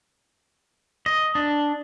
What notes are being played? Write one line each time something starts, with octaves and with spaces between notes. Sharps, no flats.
D#5
D4